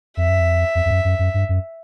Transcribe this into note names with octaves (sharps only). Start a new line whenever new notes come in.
F2 E5
F#2
F2
F2
F2
F#2
F#2
F#2
G2
F#2